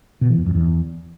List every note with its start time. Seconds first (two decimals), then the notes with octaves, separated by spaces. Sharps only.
0.21 B2
0.30 E3
0.38 E2
0.46 F2
0.55 E2